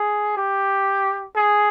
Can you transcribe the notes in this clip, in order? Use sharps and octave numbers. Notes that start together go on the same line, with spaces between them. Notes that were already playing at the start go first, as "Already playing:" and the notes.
Already playing: G#4
G4
G#4